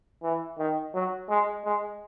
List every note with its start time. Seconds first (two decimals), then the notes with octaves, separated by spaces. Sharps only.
0.23 E3
0.58 D#3
0.94 F#3
1.29 G#3
1.65 G#3